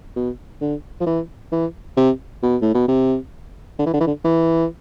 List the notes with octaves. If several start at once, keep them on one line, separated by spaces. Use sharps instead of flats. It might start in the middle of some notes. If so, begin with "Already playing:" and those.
B2
D3
F3
E3
E3
C3
B2
A2
B2
C3
D3
E3
D3
E3
D3
E3